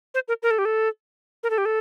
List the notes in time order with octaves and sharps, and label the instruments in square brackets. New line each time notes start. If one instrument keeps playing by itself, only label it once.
[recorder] C5
A#4
A#4
A4
G4
A4
A#4
A4
G4
A4